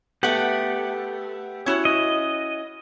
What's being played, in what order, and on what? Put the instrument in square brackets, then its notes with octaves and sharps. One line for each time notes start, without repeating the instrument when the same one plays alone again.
[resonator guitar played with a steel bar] A3 B3 [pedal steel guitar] G4 F#5
[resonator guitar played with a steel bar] C#4 E4 F#4
[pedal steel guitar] D#5